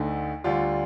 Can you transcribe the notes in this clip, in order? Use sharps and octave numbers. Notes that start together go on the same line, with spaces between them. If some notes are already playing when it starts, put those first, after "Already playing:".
Already playing: D2 D3 A3 D#4
D2 D3 G3 D4 F4